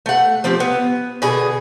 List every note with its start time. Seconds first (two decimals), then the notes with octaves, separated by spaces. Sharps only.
0.06 A3 F#5
0.44 F3 C4 G4
0.60 B3
1.22 B2 D3 G#4